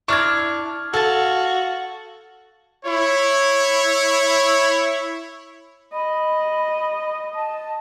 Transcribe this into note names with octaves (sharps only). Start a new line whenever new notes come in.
D4 E4 C#6 F6 G#6
F#4 A4 F5 A5
E4 C#5
D#5 B5
A5